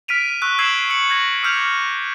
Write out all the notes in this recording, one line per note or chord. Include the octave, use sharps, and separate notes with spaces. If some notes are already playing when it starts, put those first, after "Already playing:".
F6 B6 D7 D#7 F7
C#6 E6 F#6
E6 G#6 C7 D#7 E7 F#7
E6 C#7 F#7
G#6 A#6 F#7
D6 E6 F6 G6 F7